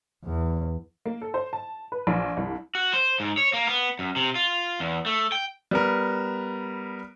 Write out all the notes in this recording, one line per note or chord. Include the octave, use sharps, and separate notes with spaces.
E2
A#3
A4
C5
A5
B4
A#1
C2
F#4
C5
G#2
C#5
A#3
B3
F#2
C3
F4
E2
A3
G5
G3 B3 A#4